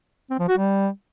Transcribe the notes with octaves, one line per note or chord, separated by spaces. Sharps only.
C4
F3
F#4
G3